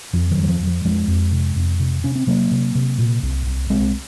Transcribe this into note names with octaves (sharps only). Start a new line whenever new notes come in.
F2 F3
D#3 F#3
F2
F#3
F3
F2
F3
F2 F3 G#3
F2
C3
F2
C3
C3 C#4
C4
C3 F#3 A#3
C3
C3
A#2
C2
C2
C2 G#3 C4